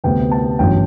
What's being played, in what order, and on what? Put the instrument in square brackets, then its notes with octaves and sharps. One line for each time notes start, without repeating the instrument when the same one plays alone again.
[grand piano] D2 C3 G3 B3 G5
A5
A1 G2 F#3 G5